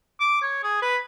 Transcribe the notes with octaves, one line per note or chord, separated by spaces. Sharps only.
D6
C#5
G#4
B4